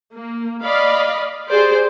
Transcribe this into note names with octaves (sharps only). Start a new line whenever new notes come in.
A#3
D5 D#5 F5 B5
G4 G#4 C5 D5